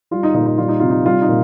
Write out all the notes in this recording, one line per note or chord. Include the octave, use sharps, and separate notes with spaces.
G3 F4
D#4
A#2 D#4
D#4
G3 F4
D#4
C3 F4
D#4
G3 F4
D#4
A#2